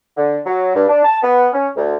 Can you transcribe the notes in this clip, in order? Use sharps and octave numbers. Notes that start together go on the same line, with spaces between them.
D3
F#3
G2
D4
A5
B3
C#4
D2